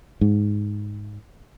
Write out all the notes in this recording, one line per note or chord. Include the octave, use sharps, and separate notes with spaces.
G#2